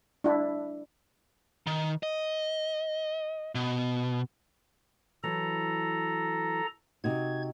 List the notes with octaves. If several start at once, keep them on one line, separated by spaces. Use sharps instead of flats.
D4 E4
D#3
D#5
B2
E3 F#3 A4 A#5
C3 D#4 F#4 G#6